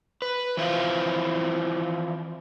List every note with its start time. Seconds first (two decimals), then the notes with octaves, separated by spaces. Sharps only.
0.22 B4
0.57 E3 F3 C4 E4 F4